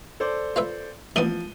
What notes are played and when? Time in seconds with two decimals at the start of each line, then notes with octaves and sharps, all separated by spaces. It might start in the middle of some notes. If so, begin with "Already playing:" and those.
0.20 A4 C5 D5
0.56 F4 B4 E5
1.16 A1 A#2 F3 B3 D#7 G7